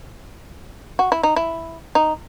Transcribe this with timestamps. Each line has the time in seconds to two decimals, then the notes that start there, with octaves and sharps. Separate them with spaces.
0.99 F#4
1.12 E4
1.23 D#4
1.36 E4
1.95 D#4